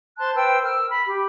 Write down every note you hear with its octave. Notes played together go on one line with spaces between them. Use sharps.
C5 A5 C6 F#6
B4 C5 G5 E6
A#4 E6 F6
B5
G4